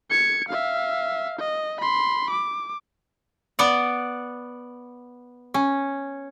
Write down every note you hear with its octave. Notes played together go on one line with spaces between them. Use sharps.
G#6 C#7
E5 F5
D#5
B5 C6
D6
B3 D5 F#5
C#4